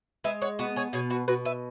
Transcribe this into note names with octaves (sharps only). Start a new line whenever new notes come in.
G#3 B4 E5
C#5 F#5
B3 F#4 B4
G#4 C#5
B2 G#4 C#5
F#4 B4
B2 F#4 B4
B4 E5